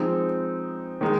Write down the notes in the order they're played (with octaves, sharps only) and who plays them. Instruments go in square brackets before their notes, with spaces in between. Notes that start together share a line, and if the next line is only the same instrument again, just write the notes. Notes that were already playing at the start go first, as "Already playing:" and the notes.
Already playing: [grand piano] F3 G#3 C4 D#4
D#3 G#3 D#4